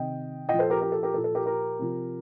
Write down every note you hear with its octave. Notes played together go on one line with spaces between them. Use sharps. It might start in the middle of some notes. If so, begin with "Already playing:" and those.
Already playing: C3 D#3 D#5 G5
A#2 F3 D#5 G5
A4 C5
G4 A#4
G4 A#4
A4
G4 A#4
A#2 F3 A4
A4
G4 A#4
G4 A#4
C3 F3